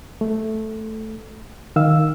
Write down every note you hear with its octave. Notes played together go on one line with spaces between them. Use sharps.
A3
D#3 F5 E6